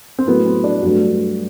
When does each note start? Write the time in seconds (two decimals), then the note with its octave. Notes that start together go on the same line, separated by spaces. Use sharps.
0.19 C4
0.27 A2 F#3 A3 B3
0.46 C4
0.64 D4
0.82 G2 F#3 A3 F#4